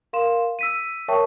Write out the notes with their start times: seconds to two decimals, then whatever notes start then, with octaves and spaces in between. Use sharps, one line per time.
0.13 A#4 F5 C6 E7
0.59 E6 B6 D#7
1.08 A#4 C#5 E5 G5 A5 C#6